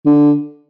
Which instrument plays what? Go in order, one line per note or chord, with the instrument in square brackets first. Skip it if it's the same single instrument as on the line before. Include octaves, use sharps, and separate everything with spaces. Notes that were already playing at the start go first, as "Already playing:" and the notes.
[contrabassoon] D3